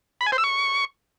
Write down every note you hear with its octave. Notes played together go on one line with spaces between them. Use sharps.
B5
G#5
C5
E6
C#6